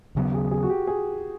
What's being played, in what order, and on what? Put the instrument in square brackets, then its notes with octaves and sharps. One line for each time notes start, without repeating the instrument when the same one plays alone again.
[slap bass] D#2 C#3 F#3 B3
[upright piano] G#4
G#4
F#4
G4
G#4